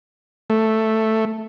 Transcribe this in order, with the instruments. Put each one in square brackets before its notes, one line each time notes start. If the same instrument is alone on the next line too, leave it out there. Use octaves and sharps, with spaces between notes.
[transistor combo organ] A3